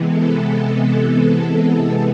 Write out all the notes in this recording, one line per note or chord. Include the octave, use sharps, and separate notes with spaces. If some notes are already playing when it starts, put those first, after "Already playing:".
Already playing: C3 E3 G#3 B3
A4